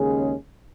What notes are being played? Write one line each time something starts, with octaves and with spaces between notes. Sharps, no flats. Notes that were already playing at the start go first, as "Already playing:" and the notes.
Already playing: D#2 C#3 G#3 C#4 G#4